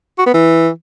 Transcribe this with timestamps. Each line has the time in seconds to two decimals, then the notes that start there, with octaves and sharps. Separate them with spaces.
0.18 F#4
0.26 B3
0.34 E3